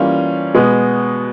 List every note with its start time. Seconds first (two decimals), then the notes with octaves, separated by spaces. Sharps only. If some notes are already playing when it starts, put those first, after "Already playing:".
Already playing: E3 G3 A#3 C#4 F4
0.54 B2 G#3 B3